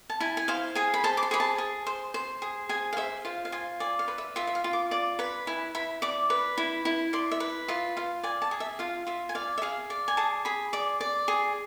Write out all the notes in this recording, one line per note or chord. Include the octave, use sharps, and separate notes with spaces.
A5
E4 G#5
G#5
C5 F5
G#4 G#5
B5
C5 A5
D6
C6
G#4 B5
A5
G#4
C5
C5
G#4
G#4 G#5
F5
C5 E5
F4 F5
F5
F4 G#5
D5 G#5
F5
B4
E5
F4 E5
E5
F5
F4
D6
D5 D6
B4 B5
E4 G#5
E4 B5
D5 D6
B4
E4
E4
D5 C6
E5
B4
F4 E5
F4 F5
D5 G#5
A5
G#4
E5
F4 F5
F4 E5
G#5
D5 F5
E5
G#4 F5
D5
G#5
G#4 A5
G#4 B5
D5 D6
D5
G#4